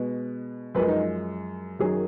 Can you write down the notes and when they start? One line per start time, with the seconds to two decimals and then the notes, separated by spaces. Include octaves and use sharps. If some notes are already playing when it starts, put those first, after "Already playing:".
Already playing: B2 G#3 B4
0.75 F#2 F3 G#3 B4
0.88 D#4
1.79 F#2 D#3 F#3 G#4